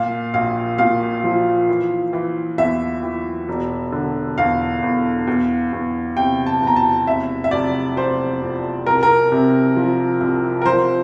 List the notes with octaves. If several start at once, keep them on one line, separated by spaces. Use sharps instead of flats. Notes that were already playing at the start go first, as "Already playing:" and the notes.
Already playing: A#2 F5
A#1 F5
A#2 F5
F3
E3
E3
E2 E5
E3
E1
D3
E2 F5
E2
E2
E2
C3 G5
A5
E2
A#5
A5
F1 E5
E5
F1 D5
F1 C5
F2
C2 A#4
A#4
C3
F3
C2
A#4
F3 C5